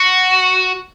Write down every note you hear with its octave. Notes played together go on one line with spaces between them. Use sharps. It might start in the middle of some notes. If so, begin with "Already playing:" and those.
Already playing: F#4